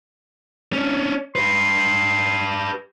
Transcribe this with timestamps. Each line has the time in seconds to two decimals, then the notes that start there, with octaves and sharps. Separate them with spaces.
0.73 C#4 D4
1.35 G4 B4 C6